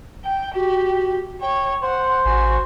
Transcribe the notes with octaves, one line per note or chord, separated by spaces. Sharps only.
G5
F#4 G4
C#5 G5
C5 F#5 C6
A1 F#4 G#5